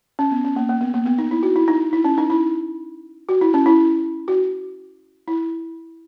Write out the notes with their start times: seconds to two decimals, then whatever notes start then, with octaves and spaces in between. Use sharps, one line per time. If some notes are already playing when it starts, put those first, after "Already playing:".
0.19 C#4
0.31 B3
0.44 C#4
0.56 A#3
0.69 A#3
0.81 B3
0.94 A#3
1.06 B3
1.18 D#4
1.31 E4
1.43 F#4
1.56 E4
1.68 D#4
1.93 E4
2.04 C#4
2.18 D#4
2.30 E4
3.29 F#4
3.41 E4
3.54 C#4
3.66 E4
4.28 F#4
5.28 E4